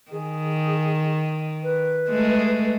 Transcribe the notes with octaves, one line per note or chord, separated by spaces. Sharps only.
D#3 G#4
B4
G#3 A3